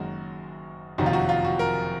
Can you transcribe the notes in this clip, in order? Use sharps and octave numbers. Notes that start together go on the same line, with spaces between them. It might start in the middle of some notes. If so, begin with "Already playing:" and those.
Already playing: F#1 F#2 D#3 G#3 F#4
F#1 F2 C3 D#3 F#3 F#4
F4
F#4
F4
F#4
A#4